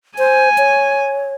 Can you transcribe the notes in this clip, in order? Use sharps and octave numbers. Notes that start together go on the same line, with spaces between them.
C5 G#5
C#5